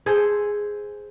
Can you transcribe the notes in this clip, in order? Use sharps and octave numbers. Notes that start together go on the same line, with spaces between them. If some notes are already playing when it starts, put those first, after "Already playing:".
G#4 A4 C5